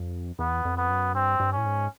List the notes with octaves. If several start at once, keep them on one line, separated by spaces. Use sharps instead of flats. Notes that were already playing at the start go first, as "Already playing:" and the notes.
Already playing: F2
E2 B3
F2
B3
F#2
G2 C4
G2
C#4
A2
G#2